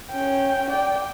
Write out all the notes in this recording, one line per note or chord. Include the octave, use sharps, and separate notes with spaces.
C#4 G5
D5 G5